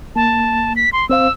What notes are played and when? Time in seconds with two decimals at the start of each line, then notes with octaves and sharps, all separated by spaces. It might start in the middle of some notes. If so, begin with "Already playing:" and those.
0.16 A#3 A5
0.76 B6
0.93 C6
1.10 C4 C5 F5 E6